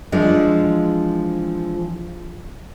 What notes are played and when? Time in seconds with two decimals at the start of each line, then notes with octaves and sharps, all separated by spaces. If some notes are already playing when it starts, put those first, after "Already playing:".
0.12 E3 F3 G#3 D4